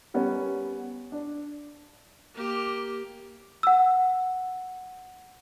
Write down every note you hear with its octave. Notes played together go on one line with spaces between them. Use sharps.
G3 B3 C#4 A#4
D4
A#3 G4
F#5 E6